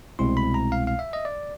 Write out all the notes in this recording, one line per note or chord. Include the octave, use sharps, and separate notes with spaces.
C2 B2 G#3 C4 E4 C6
B5
A#5
F5
F5
E5
D#5
D5